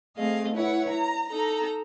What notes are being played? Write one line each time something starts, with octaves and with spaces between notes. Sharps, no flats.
A3 C4 G#4 D#5 F5
E4 B4 C#5 F#5
A#5
D#4 A4 A#5